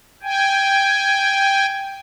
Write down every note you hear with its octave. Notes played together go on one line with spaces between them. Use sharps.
G5 G#5